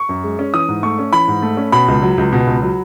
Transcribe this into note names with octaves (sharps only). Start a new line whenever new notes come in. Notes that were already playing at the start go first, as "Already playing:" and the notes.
Already playing: C#6
F#2
G#3
C#4
E3 D#6
G#2
A3 C#6
C#4
E3 B5
G#2
A3
C#4
B2 B5
C#2
F#3
C#2
B2
C#2
F#3